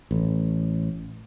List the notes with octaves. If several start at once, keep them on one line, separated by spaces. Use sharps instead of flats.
A1